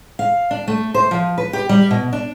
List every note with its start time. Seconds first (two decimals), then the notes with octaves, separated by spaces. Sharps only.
0.19 F5
0.51 D4
0.68 A3
0.94 C5
1.11 F3
1.38 B4
1.53 G4
1.69 G3
1.91 B2
2.13 D4